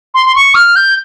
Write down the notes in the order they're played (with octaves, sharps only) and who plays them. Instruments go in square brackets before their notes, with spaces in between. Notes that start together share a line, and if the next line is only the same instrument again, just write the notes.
[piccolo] C6
C6
C#6
F6
G6